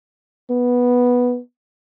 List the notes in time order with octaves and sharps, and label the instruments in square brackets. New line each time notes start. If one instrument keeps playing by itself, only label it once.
[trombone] B3